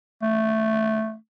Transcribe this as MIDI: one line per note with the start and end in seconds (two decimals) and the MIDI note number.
0.22 1.15 57